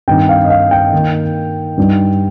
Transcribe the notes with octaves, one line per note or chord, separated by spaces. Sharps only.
G2 D#3 C4 D#4 G5
F5
D#5
F5
G5
D#3 A#3 D#4
G2 G3 D#4